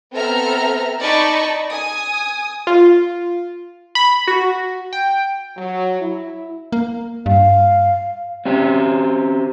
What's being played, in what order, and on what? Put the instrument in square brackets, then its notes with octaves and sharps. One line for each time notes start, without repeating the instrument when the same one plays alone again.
[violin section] B3 C4 A4 E5 A#5 F6
D#4 D5 D#5 A5 B5 C#6
G#5 D#6
[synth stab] F4
B5
F#4
G5
[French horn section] F#3
E4
[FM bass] A#3
[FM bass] G2 [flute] F5
[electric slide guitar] C4 C#4 G4